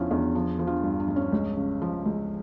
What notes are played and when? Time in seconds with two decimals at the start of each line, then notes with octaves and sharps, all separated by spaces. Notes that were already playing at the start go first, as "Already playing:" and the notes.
Already playing: E2 C#3 F3 C#4 D4 E4 F4
0.11 E2 D4
0.35 F3 D4
0.59 F3
0.67 D4 F4
0.83 G2
1.00 D4
1.08 G2
1.16 C#4
1.33 C#2
1.57 C#3
1.82 F3
2.06 C#2